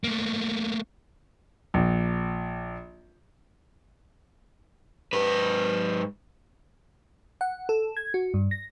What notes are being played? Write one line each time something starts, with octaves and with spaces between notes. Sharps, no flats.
A3 A#3
A#1
G#2 B4
F#5
A4
G#6
F#4
G2
A#6